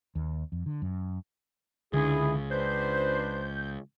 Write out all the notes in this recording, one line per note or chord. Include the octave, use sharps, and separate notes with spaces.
D#2
F2
D3
F#2
C#2 D3 E4 G#4
D4 B4 C5 G6